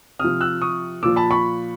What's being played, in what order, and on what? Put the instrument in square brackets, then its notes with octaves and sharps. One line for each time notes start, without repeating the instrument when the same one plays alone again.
[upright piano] C3 F3 D#6 F6
E6 F#6
C#6 D#6
A#2 F3 D6 E6
A5 B5
B5 C#6